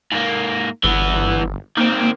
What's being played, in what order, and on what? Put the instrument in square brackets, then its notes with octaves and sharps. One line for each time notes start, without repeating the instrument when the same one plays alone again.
[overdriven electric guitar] G#2 A#3
[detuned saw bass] G1 [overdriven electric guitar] E3 B3
[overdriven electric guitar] D#3 C4 [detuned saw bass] A#3